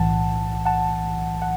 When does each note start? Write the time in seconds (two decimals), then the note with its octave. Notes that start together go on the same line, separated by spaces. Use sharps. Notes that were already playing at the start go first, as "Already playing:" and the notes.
Already playing: B1 A2 E3 F#5 A5
0.65 F#5 A5
1.42 F#5